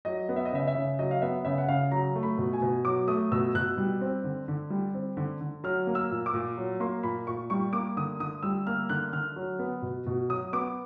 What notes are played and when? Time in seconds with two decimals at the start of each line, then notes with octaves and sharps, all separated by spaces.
0.05 F#3 D#5
0.29 B3
0.36 E5
0.45 D#5
0.52 C#3 E5
0.67 E5
0.75 C#3
0.99 F#3 D#5
1.11 F5
1.22 B3 E5
1.45 C#3 E5
1.58 F#5
1.68 C#3 F5
1.91 F#3 A#5
2.16 A3
2.23 B5
2.38 B2
2.53 G#5
2.62 B2
2.85 F#3 D6
3.08 A3 D#6
3.31 B2 E6
3.54 B2 F#6
3.78 G3
4.01 C4
4.24 D3
4.48 D3
4.70 G3
4.94 C4
5.17 D3
5.41 D3
5.64 F#3 F6
5.87 A#3
5.95 E6
6.11 A#2
6.26 D6
6.33 A#2
6.57 F#3
6.80 A#3 C6
7.03 A#2 B5
7.27 A#2 C#6
7.50 G3 C#6
7.73 A#3 D6
7.97 D3 D#6
8.20 D3 D#6
8.43 G3 E6
8.67 A#3 F6
8.89 D3 F#6
9.12 D3 F6
9.36 F#3
9.59 B3
9.82 B2
10.06 B2
10.29 F#3 D#6
10.53 B3 D6